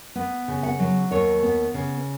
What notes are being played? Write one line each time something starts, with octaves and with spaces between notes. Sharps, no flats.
B3
C#3
F#5
F#3
D#2 C#5
B3
C#3